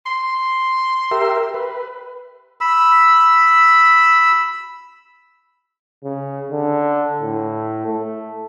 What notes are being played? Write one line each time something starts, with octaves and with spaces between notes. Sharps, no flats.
C6
G4 A#4 E5
B4
B5 E6
C#3
D3
A2
A3